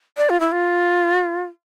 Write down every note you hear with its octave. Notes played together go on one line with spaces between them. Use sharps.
D5
F4
E4
F4